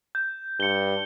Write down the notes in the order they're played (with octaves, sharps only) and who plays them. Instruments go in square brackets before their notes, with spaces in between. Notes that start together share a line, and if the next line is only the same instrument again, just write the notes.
[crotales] G6
[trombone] G2 [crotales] C#7 G7